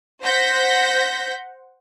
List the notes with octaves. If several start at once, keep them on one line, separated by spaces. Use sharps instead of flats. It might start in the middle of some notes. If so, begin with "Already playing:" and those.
C5 F#5 G6 A#6 B6